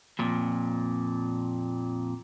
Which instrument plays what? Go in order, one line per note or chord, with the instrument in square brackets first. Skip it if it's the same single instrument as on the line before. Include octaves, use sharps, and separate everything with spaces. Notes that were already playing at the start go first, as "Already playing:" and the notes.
[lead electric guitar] F2 A#2